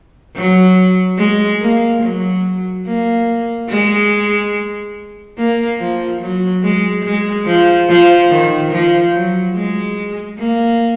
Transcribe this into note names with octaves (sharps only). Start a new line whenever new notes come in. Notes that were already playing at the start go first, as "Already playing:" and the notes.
F#3
G#3
A#3
F#3
A#3
G#3
A#3
F3
F#3
G#3
G#3
F3
F3
D#3
F3
F#3
G#3
A#3